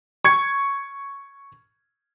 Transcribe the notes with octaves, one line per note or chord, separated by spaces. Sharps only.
C#6 G#6 C#7